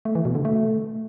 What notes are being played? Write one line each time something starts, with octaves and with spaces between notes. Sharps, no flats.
A3
E3
B2
D3
A3